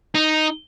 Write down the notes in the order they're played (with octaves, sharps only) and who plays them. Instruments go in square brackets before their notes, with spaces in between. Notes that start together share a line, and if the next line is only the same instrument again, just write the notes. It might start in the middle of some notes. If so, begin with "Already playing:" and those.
[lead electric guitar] D#4